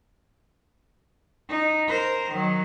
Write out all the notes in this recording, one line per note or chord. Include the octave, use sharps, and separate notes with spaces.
D#4
A#4 C5
D#3 F#3